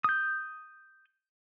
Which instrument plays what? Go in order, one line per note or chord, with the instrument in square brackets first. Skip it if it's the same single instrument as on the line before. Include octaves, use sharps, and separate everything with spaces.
[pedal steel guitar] D#6 G6